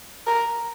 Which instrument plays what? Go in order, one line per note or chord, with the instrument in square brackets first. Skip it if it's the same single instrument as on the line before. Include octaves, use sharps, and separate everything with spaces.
[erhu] A#4